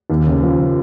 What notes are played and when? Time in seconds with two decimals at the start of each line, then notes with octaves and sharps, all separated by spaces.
0.10 D#2
0.27 C#3
0.43 F3